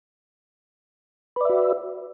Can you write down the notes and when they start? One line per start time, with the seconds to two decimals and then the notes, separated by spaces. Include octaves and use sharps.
1.36 B4
1.41 D5
1.45 E5
1.50 F#4